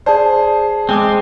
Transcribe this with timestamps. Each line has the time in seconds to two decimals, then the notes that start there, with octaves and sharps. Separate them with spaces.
0.06 G#4 C5 D5 A5
0.89 G#3 C4 G#5 D6